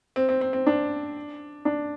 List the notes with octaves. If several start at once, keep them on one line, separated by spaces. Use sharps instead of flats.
C4
C4
C4
C4
D4
D4